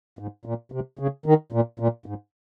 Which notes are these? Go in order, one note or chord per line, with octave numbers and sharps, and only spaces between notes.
G#2
A#2
C3
C#3
D#3
A#2
A#2
G#2